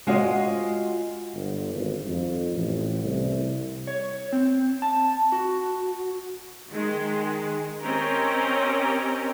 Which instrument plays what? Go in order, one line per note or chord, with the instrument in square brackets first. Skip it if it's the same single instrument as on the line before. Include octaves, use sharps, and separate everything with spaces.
[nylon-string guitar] G#3 F4 F#4 C5 D5 D#5
[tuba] G1
G#1
F2
A1
C2
[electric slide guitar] C#5
C4
A5
F#4
[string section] D#3 G#3
C4 C#4 G4 A#4 D#5